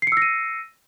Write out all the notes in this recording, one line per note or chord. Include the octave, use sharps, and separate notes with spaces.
E6 A#6 C7 C#7 D#7